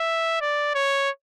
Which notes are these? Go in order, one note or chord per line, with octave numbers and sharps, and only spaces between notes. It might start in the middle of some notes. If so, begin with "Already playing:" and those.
Already playing: E5
D5
C#5